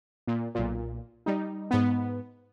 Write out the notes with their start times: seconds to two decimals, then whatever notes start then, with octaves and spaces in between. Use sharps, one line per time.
0.27 A#2
0.55 B1 A#2
1.26 G3 D#4
1.71 G#2 B3